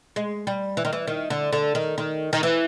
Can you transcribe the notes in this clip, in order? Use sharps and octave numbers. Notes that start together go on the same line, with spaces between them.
G#3
G3
E3
D#3
E3
D#3
D3
D3
D#3
D#3
D#3
E3